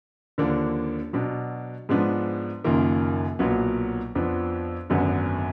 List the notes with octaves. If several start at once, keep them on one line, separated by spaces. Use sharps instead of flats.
D#2 D3 F3 A#3 D4
B2 F#3 D4
G#2 F3 G#3 B3 D4
F#1 F#2 D#3 A#3 F4
B1 A#2 F#3 B3
F2 F3 B3 D4
G#1 F#2 D3 F#3 B3